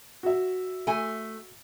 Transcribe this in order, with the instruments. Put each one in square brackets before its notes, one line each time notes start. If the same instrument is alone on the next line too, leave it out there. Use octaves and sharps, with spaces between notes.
[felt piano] F#4 E5
[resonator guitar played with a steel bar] A3 G#5